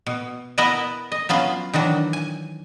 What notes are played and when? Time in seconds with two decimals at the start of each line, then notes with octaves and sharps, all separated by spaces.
0.06 B2
0.58 B3 E4 A#4 B4 D#5 A5
1.12 D#5
1.29 F#3 B3 C#4 F4
1.74 D#3 E3 F#3 D4
2.13 G#5